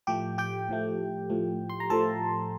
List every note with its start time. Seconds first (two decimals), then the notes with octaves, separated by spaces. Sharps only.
0.07 A2 F3 A3 G4 G5
0.38 G4 G5
0.69 A2 F3 A3
1.29 A2 F3 A3
1.70 C6
1.80 A#5
1.90 A2 F3 A3 A4 A5